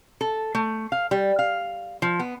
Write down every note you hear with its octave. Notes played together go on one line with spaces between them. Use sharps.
A4
A3
F5
G3
F5
F3
B3